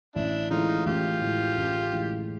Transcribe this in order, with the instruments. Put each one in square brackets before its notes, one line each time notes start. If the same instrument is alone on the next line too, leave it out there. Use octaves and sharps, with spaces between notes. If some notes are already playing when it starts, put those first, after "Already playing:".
[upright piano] A1 [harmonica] D4 E4
[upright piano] A2 E3 G#3 [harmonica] D#4 F4
[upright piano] A1 [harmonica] F4 G4
[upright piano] A2 E3 G#3
A1
A2 E3 G#3